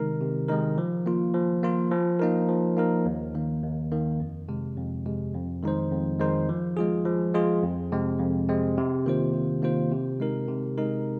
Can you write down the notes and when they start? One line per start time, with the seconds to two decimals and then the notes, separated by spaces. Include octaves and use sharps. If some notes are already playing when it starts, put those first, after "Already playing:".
Already playing: C3 D#3 G#3 D#4 A#4
0.21 C3
0.48 D#3 G#3 D#4 A#4
0.78 F3
1.06 A#3 F4
1.34 F3
1.63 A#3 F4
1.91 F3
2.19 A#3 D#4 A#4
2.49 F3
2.77 A#3 D#4 A#4
3.05 D#2
3.35 D#3 A#3
3.63 D#2
3.92 D#3 A#3
4.20 F2
4.49 C3 G#3
4.77 F2
5.06 C3 G#3
5.34 F2
5.63 D#3 G#3 D#4 C5
5.92 F2
6.20 D#3 G#3 D#4 C5
6.49 F3
6.77 G#3 F4 G#4
7.05 F3
7.34 G#3 F4 G#4
7.63 F2
7.92 C3 G#3 C4
8.20 F2
8.49 C3 G#3 C4
8.77 C3
9.06 D#3 A#3 F4 C5
9.34 C3
9.62 D#3 A#3 F4 C5
9.92 C3
10.20 G#3 D#4 A#4
10.48 C3
10.78 G#3 D#4 A#4